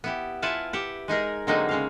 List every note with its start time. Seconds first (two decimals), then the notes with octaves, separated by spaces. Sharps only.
0.04 B3 E4 G4
0.42 E4 F4 B4 F#5 G#5 A5
0.73 G4 E5 F#5
1.08 G#3 D#4 G#4 A#4
1.47 D3 F#3 G#3 A#3 C4 D#4
1.69 C#3 G#3 F5